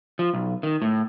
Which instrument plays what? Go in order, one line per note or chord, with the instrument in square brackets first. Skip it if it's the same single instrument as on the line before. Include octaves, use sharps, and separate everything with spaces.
[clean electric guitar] F3
B1
D#3
A2